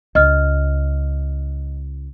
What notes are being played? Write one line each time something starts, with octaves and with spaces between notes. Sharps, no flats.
C#2 D#5 F6